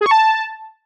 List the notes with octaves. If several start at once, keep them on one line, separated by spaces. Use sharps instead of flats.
G#4
C#6
A5